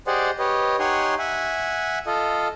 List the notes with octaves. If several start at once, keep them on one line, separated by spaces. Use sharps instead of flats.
G4 G#4 C5 D5 D#5 F#5
G4 B4 C#5 D#5
D#4 G4 C#5 F#5 G#5 C6
E5 F#5 G#5
F4 A4 D#5